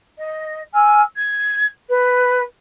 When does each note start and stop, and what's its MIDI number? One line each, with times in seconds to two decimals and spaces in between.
0.18 0.61 75
0.73 1.01 80
0.73 1.01 88
0.73 1.01 89
1.15 1.65 92
1.90 2.41 71